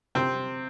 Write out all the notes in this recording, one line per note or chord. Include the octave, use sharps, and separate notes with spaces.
C3 C4